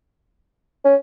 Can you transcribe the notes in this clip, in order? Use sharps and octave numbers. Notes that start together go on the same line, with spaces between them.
C#4